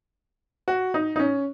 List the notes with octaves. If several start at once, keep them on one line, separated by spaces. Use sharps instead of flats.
F#4
D#4
D#4
C#4